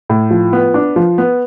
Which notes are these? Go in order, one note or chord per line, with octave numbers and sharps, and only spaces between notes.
A2
F3
B3
D4
F3
B3